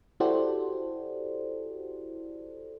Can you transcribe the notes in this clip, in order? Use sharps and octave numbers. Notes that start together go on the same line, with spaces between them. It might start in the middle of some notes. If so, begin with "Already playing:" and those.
E4 F#4 G4 A4 C5 D5